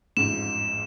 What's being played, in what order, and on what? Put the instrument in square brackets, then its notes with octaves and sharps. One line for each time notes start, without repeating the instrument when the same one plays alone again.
[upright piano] A1 F2 G#2 [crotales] E7